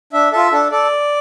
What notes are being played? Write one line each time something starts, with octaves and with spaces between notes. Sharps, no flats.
D4 E5
F4 A4 E5
D4 A4
A4 D5